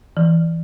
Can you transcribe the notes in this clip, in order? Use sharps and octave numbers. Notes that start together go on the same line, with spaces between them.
E3